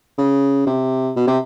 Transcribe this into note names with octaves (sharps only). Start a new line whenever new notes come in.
C#3
C3
B2
C3